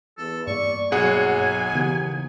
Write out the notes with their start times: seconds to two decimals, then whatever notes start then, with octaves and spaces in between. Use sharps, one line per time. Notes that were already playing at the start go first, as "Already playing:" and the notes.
0.18 E2 A4
0.47 G2 A#3 D5 C#6
0.92 B1 F#3 G#4 F#5 G#5
1.73 D#2 C#3 E3 B3